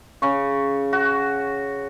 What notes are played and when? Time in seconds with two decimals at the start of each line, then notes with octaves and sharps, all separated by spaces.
0.22 C#3 C#6
0.93 F#4